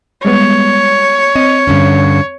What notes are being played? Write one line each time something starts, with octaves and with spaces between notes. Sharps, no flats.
G3 G#3 B3 C#5
C4 D#5 D#7
G2 D3 C#4